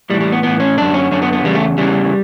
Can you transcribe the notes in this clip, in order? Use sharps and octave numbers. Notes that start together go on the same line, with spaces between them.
A2 E3 G3
G3
B3
A2 E3 B3
C#4
F#2 D3 D4
C#4
F#2 D3 C#4
B3
B3
E2 C#3 G3
A3
E2 C#3 E3 G3